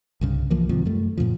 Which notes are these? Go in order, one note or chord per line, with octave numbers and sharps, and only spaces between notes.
C2 G2 C#3
C2 E3 F3 A#3
G#2 C3 D#3 F3
F#2 G3 A3
F#2 A#2 C#3 F3